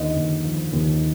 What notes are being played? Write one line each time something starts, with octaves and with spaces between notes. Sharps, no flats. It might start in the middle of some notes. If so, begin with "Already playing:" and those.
Already playing: D#2 D3 D#5
D#2
F3
D#2